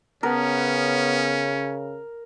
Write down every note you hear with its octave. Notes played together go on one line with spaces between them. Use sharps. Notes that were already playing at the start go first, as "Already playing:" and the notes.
C#3 B3 C#4 A#4